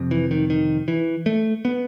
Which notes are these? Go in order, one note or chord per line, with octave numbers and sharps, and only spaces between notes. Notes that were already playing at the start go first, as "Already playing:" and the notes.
Already playing: F2 C3
E3
D#3
D#3
E3
A3
B3